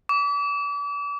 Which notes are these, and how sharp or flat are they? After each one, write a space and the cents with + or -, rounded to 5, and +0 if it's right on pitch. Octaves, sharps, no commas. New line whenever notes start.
D6 -40